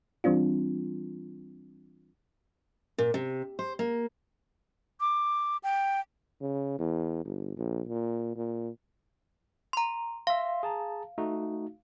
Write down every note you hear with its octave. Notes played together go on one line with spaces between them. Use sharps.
E3 G3 C4 D4 F4
A#2
C3
C5
A#3
D6
G5
C#3
E2
G1
A#1
A#2
A#2
A#5 C6
E5 F5 C6
G#4 A5 A#5
A3 D#4 F#4